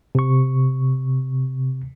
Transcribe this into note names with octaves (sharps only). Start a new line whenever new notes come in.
C3 C#6